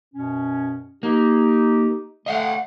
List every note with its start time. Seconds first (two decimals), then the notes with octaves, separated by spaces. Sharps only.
0.14 F#2 B2 C#4
1.03 A#3 D#4 G4
2.26 D3 A3 D#5 F5 F#5